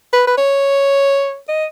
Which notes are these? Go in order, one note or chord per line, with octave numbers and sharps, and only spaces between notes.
B4
B4
C#5
D#5